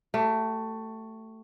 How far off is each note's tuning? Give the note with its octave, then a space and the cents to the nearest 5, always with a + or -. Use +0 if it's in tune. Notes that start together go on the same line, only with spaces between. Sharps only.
A3 +15 G4 -30